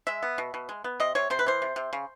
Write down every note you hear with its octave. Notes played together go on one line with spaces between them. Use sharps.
G#3 E5
B3
B2
B2
G#3
B3
C3 D#5
C3 C#5
C3 C5
B4
E3 C5
C3
C3
C#3